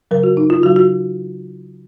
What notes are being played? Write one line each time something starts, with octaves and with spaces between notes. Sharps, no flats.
C#3 F#3 A#4
F#4
D#4
F4
C#3 F#3 F#4
F#4